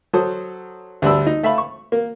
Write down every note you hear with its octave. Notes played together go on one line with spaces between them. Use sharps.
F#3 A4 C5 D#6
D2 G3 D4 B5 E6
D#4
A3 E5 F5 B5
C#6
A#3